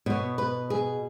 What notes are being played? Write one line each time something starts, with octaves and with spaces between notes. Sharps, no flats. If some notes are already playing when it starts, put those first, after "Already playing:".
B2 B3 C#5
B4
G#4